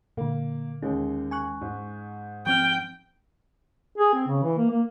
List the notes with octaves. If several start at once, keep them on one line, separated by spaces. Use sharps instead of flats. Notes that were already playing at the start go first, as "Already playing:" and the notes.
A#2 D3 A#3
D#2 D#3 G#3 C#4
G#5 C#6 F#6
G#2
F3 C4 G5 F6
G#4
C4
C#3
E3
A#3
A#3